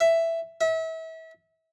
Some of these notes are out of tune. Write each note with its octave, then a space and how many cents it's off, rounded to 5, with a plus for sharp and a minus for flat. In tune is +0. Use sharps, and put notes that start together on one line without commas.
E5 +5
E5 -35